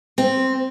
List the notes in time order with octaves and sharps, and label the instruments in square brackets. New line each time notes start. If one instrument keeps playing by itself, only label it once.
[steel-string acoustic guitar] C4